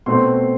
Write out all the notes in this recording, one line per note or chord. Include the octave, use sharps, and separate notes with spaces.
B2 A3 C4 C6